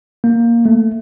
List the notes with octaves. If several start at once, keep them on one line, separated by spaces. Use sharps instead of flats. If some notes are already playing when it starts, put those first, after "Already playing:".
A#3
A3